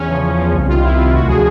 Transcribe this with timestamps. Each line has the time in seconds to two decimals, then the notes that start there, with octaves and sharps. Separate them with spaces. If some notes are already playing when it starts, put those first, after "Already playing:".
Already playing: E2 C#4
0.09 C#3 F3
0.23 E2
0.38 C#3 F3
0.53 C2
0.68 C3 D#3 F4
0.83 C2 E4
0.98 C3 D#3 F4
1.13 D2 F#4
1.28 D3 F3 G#4